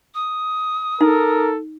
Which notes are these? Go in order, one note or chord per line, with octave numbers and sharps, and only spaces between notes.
D#6
D#4 A4 A#4